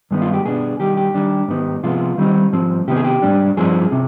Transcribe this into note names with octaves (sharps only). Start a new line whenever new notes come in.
G2 D#3 G#3 B3 D#4
F4
G4
B2 B3 D4 G#4
D#3 G3 C4 D#4 G4
G4
D#3 G3 D4
G#2 D#3 B3 D#4
C3 F3 G#3 B3 F4
D#3 G3 C4 D#4
G#2 F3 C4
C3 D#3 B3 D#4 G4
G#4
G4
G#2 G3 D4
G2 F3 C4 D#4 G#4
C3